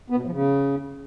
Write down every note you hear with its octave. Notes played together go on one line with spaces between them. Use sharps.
B3
B2
A2
F3
C#3